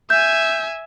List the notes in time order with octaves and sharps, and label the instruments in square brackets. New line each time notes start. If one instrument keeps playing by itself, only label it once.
[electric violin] E5 G#5 [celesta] G6